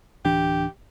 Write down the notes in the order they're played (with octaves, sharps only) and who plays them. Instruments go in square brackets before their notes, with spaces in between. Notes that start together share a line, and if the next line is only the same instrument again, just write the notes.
[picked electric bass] D1 E3 D4 [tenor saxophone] G4